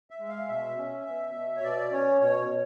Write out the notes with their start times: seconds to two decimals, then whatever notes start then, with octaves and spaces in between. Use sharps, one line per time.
0.11 E5
0.20 G#3
0.29 F5
0.48 B2 E5
0.77 C#4
1.06 B2
1.35 B2
1.56 C#5
1.63 B2 D5
1.91 C#4 C#5
2.21 B2 C#5
2.49 B2